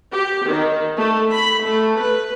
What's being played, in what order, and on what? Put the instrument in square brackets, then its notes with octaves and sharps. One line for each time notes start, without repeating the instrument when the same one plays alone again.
[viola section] G4
D#3
A3
B5
A3
B4